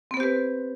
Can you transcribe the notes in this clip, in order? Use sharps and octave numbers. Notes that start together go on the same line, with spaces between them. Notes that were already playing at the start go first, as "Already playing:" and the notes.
B3 C4 G4 B4 C5